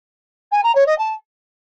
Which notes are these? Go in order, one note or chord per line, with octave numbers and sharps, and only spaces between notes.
G#5
A#5
C#5
D#5
A5